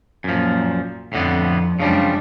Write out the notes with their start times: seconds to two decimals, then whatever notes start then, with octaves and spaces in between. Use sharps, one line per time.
0.24 F#2 A#2 F3
1.13 F2 A2 D3 B3
1.80 F#2 C#3 F3 G3 G#3 D4